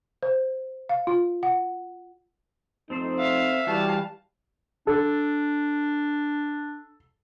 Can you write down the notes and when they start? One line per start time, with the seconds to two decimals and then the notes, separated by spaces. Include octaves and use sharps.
0.23 C5
0.89 F5
1.07 F4
1.43 F#5
2.90 F2 A3 C4 D#4 A4 C5
3.19 E5 F5
3.67 E3 G3 F#4 F5 A5
4.87 D4 A4